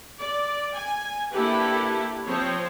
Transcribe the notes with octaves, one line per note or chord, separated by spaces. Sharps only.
D5
G#5
A#3 D4 E4 G4 A4 B4
F3 C4 C5 C#5